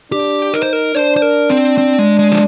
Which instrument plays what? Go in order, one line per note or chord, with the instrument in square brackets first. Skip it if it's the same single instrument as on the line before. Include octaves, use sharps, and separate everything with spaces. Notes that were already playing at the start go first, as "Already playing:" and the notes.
[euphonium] D4 [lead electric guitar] G4
[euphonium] D#4 [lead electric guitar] A#4
[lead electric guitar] C5
A#4
[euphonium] D4 [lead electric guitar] C5
[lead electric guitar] C5
A#4
C4
C4
G#3
G#3
F3